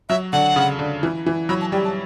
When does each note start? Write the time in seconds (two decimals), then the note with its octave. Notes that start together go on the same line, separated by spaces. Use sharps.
0.09 F#3 E5
0.33 D3 F#5
0.56 C#3
0.79 D3
1.03 E3
1.26 E3
1.49 F#3 B5
1.61 A5
1.72 G3 G5
1.85 A5